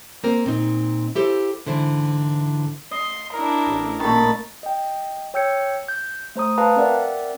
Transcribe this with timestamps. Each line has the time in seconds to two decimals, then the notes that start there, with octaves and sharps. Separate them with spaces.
0.24 A#3 C4 A#4
0.46 A#2 C4 D#4
1.15 E4 G4 A4 C5
1.66 G#2 D3 E3 E4 C5
2.91 D#5 C6
3.33 D4 E4 A#4
3.67 A1
4.00 A#2 D#3 A3 B5 A6
4.63 D#5 G5
5.34 C#5 G5 E6 G6 G#6 C#7
5.88 G6
6.35 A3 C5 A#5 D#6
6.58 B4 F5 A5 A#5
6.76 C4 A#4 D5 E5 F#5